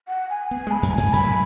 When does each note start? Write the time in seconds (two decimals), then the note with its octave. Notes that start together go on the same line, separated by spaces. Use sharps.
0.08 F#5
0.30 G#5
0.51 B3 G#5
0.67 G#3
0.72 B5
0.83 F#2
0.93 G#2 G#5
1.13 F#2 B5